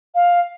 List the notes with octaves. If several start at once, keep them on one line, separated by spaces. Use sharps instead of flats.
F5